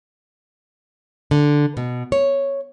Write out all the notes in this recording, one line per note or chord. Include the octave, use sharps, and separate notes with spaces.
D3
B2
C#5